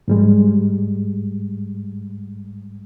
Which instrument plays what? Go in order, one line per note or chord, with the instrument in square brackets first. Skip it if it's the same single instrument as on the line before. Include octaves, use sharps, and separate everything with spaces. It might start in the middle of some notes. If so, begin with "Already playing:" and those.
[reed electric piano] G#2 G3 G#3